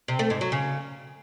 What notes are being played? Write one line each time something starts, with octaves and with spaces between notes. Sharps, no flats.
C3
A3
G#2
F#3
C#3